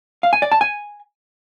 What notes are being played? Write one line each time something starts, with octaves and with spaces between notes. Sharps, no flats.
F5
G#5
D5
A5
G#5